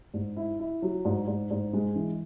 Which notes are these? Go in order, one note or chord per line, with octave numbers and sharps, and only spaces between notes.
G#2
E4
E4
F#3
G#2
G#2
G#2
G#3
E3